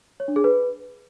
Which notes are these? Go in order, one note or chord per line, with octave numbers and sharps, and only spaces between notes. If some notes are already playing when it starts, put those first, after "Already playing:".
C#5
D4
G#4
B4